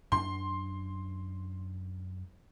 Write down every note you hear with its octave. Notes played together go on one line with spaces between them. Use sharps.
F#2 D4 C6